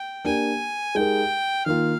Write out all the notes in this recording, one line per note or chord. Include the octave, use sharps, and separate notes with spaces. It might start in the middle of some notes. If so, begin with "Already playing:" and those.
Already playing: G5
A#3 D4 G4 A#4 G#5
G#3 D#4 G4 A#4 G5
D#3 A#3 F4 F5